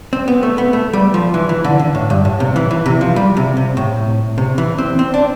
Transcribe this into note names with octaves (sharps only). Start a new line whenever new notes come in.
C4
B3
A3
B3
A3
G3
F3
E3
E3
D3
D3
A2
G2
A2
C3
E3
E3
C3
F3
G3
C3
C3
A2
C3
E3
C4
C4
D4